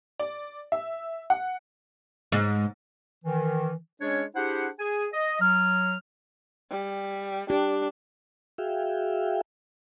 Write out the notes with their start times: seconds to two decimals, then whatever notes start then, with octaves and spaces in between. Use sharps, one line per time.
0.19 D5
0.72 E5
1.30 F#5
2.32 G#2
3.25 D#3 E3
4.01 G#3 C#4 D4 G#4 C#5
4.35 D4 E4 G4 G#4 C5 F#5
4.78 G#4 G#5
5.13 D#5
5.40 F#3 F6
6.71 G3
7.50 D4 G4
8.58 F#4 G#4 E5 F5 G5